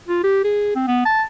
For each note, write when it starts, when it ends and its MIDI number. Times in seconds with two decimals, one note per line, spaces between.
0.08 0.22 65
0.24 0.40 67
0.44 0.71 68
0.75 0.86 60
0.88 1.01 59
1.06 1.23 81